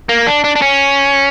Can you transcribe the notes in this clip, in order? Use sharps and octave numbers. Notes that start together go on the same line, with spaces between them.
A#3
D4
D4
D4
C#4